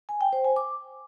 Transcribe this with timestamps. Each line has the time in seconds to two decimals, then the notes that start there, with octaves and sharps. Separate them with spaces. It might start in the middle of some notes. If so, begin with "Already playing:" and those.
0.09 G#5
0.21 G5
0.33 C5
0.45 G#5
0.56 D6